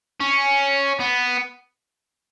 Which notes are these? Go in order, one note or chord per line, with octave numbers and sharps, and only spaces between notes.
C#4
B3